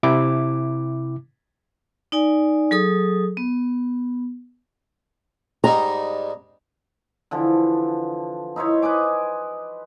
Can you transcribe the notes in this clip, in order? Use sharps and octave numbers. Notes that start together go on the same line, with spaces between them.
C3 E4 D6
D#4 D5 G#5
F#3 G#4 A4 D#6
B3
G#2 G3 D#4 A#5
D3 E3 F3
D#4 E4 C5 C#5
B4 D#5 G#5 D6